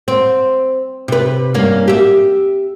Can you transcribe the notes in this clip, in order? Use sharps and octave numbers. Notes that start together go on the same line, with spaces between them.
C4
C3 B4
G2 A#3 C#4
G4 E5